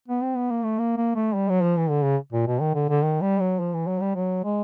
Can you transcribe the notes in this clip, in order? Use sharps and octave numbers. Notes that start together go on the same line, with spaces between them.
B3
C4
B3
A#3
A3
A#3
A#3
A3
G3
F#3
F3
E3
D3
C#3
A#2
B2
D#3
D3
D3
D#3
G3
F#3
F3
E3
F#3
G3
F#3
G#3